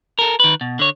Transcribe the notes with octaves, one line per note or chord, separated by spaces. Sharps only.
A4 A#4
D#3 B4
B2
D3 C#5